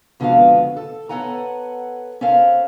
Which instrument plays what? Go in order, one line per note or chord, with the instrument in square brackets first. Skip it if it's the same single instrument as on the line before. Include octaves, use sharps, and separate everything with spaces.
[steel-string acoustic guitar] F2 D3 G#3 B3 F#4 F5
A4
B3 A4 C#5 F#5 G#5 A#5
C#4 A4 A#4 C5 F5